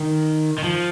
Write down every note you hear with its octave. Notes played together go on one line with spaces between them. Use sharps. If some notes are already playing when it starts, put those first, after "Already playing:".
Already playing: D#3
D#3
F3